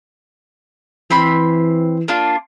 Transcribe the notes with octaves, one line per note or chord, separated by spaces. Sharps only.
E3 C4 B5 C6
A#3 D4 F4